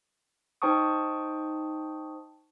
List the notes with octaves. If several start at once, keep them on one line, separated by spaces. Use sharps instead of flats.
D#4 C5 G5 A5 C#6 D#6